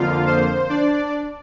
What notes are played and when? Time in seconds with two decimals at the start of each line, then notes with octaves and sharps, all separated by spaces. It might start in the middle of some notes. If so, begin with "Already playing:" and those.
Already playing: F2 D3 F3 A#3 F4 F5
0.27 C5
0.69 D4 D5